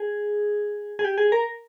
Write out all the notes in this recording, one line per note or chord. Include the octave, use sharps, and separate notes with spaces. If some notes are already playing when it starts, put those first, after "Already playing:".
Already playing: G#4
G#4
G4
G#4
A#4